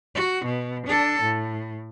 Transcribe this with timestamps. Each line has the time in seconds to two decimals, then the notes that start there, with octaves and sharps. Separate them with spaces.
0.15 F#4
0.45 B2
0.86 D4 A4
1.22 A2